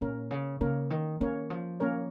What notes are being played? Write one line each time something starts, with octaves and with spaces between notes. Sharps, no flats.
A#2 A#3 C#4 A#4 C#5
C#3
C#3 A#3 C#4 A#4 C#5
D#3
D#3 A#3 C#4 A#4 C#5
F3
A#3 C#4 A#4 C#5